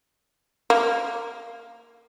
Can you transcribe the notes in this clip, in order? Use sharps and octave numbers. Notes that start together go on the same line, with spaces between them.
A#3